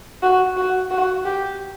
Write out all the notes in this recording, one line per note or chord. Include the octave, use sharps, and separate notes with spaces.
F#4
F#4
F#4
G4